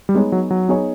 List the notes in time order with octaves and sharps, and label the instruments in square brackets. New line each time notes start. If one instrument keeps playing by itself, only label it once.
[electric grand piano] G3
[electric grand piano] G#3 [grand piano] B3 D#4 G#4 C#5
[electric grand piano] F#3
F#3
[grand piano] B3 D#4 G#4 C#5